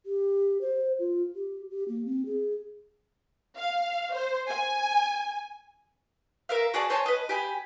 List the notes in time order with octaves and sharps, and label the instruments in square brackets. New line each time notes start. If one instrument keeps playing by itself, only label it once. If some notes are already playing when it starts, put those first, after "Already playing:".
[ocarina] G4
C5
F4
G4
G4
A#3
C4
G#4
[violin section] F5
C5
G#5
[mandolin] A#4 E5 F5
F#4 G#4 D5 A5
C5 C#5 G#5 A5
B4 D#5
G4 G#5 B5